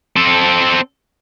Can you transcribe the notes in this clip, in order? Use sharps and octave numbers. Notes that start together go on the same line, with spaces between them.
C4 A4